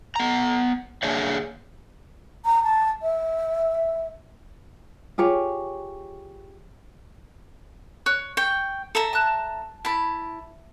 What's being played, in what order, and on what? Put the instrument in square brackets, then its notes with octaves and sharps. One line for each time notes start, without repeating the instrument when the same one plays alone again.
[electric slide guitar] B3 A#5
A#3 D4 G#4 C#5 D5 E5
[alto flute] A#5
A5
E5
[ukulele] F4 G4 G#4 C#5
[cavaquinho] C#5 [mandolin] F#6
[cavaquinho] G5 C#6
A4 E5 A#5
[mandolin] A5 F#6
[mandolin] E4 [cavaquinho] A5 B5